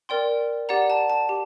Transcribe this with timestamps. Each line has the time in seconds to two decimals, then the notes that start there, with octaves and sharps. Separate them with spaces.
0.09 A#4 D5 G5 C6
0.69 G4 D5 F#5 A#5
0.90 A5
1.10 A5
1.29 G4